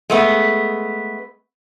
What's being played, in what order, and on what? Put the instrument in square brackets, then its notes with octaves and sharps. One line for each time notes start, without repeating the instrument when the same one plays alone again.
[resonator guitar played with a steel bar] G#3 A3 B3